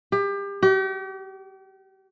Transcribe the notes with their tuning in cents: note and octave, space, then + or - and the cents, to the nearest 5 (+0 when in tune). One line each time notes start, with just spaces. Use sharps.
G4 +30
G4 -40